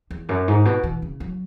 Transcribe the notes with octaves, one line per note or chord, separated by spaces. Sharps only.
E2
F#2
G#2
B2
E3
C#3
F#3